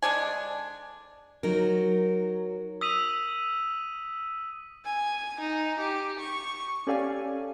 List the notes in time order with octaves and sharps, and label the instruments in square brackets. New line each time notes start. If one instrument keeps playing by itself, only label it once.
[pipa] D3 G#3 D4 G#5
[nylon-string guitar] F#3 D#4 A#4
[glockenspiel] D#6 F7 F#7 [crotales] E6 B6 D#7
[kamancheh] G#5
D#4
G4
C#6
[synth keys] C#4 G4 A4 D5 F5 G#5